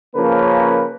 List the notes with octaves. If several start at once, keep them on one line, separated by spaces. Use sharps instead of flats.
C#3 F3 A#3 C#4 A#4 B4